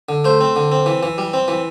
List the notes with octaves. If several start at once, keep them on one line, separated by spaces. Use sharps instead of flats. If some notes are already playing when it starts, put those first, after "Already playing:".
D3
A3 C5
C4
D3
C4
E3
E3
G3
C4
E3